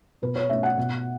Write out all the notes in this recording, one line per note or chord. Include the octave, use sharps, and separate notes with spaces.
B2 B4
C#5
A3 C#4 E5
F#5
B2